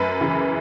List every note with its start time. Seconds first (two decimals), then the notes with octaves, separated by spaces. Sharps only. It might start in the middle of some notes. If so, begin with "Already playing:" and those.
Already playing: F#2 B4
0.21 C#3 E3